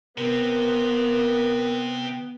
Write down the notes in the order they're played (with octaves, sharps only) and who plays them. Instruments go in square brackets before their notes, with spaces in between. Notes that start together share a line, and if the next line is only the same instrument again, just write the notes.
[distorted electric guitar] C3 C4 [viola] B3 [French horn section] A#4